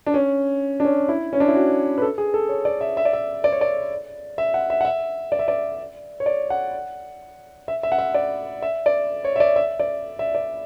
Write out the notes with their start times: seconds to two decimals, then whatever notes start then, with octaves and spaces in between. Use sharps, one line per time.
0.06 D4
0.14 C#4
0.80 D4
0.85 C#4
1.09 E4
1.33 C#4
1.40 D4
1.48 E4
1.55 F#4
1.98 B4
2.02 A4
2.18 G#4
2.34 A4
2.49 C#5
2.65 D5
2.81 E5
2.97 E5
3.05 D5
3.13 E5
3.44 D5
3.52 C#5
3.61 D5
4.38 E5
4.54 F#5
4.70 E5
4.81 F#5
4.85 E5
5.32 D5
5.39 E5
5.48 D5
6.20 C#5
6.26 D5
6.50 F#5
7.68 E5
7.83 E5
7.92 F#5
7.98 E5
8.14 D5
8.62 E5
8.86 D5
9.25 C#5
9.36 E5
9.40 D5
9.56 E5
9.79 D5
10.19 E5
10.35 D5